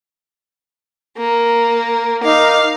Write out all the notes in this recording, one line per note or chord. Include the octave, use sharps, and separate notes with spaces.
A#3
D#4 A#4 F5 D6